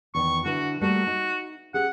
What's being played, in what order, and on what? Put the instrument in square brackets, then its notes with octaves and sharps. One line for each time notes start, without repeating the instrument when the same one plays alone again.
[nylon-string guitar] E2 D#3 [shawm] C#6
[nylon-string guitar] D3 E4 B4 [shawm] F#4
[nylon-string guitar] G3 A3 A#3 [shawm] F#4
[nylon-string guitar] D#4
[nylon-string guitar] C#4 G4 G#4 [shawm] F#5